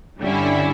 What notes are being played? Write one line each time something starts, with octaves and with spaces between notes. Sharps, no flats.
G2 D3 G3 C#4 E4